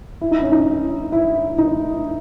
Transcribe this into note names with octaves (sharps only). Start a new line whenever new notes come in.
E4
D#4
C#4
D#4
E4
D#4